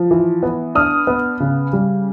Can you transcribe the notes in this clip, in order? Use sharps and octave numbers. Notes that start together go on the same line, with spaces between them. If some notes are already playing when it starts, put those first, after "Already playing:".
Already playing: F3
E3
B3
D4 D#6 F6
B3
C#3
G3